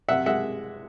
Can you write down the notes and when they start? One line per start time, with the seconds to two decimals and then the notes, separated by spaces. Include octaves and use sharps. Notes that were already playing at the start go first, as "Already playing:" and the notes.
0.08 C3 E5 F#5
0.26 G#3 E5 F#5